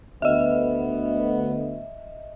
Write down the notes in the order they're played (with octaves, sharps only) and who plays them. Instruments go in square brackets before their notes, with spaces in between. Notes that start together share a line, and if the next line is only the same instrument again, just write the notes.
[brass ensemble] D2 B3 [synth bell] D#5 E5